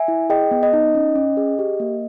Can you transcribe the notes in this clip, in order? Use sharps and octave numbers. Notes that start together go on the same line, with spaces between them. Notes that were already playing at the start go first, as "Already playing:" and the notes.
Already playing: E5 G#5
E4
G#4 D#5 G5
B3
D#5
D#4
C#4
C#4
G#4
G4
A#3